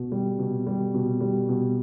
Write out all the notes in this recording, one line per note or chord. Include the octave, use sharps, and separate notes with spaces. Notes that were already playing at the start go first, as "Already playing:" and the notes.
Already playing: B2
G3
B2
G3
B2
G3
B2